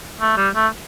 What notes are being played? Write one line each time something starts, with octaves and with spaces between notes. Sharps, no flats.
A3
G3
A3